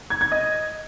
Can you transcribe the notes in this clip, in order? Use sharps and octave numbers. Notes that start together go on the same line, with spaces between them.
G#6
G#6
D#5